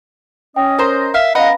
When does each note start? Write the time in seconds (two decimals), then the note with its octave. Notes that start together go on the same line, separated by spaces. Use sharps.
0.56 C#4 D#5 G5
0.79 A#4 C5 A#5
1.14 E5 F5
1.35 B3 C#4 D#5 F5 F#5 A#5 B5